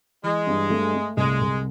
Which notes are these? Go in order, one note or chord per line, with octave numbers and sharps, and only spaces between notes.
E3 G#3
G2
A3
A3
C2 G#3
C2